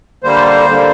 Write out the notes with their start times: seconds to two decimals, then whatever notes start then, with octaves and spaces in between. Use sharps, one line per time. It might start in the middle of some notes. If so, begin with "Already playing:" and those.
0.24 D3 G3 A#3 C5
0.68 D3 G3 A#3